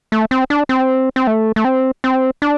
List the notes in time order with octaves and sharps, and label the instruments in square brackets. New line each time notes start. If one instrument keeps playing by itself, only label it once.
[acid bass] A3
C4
D4
C4
C4
A3
A3
C4
C4
D4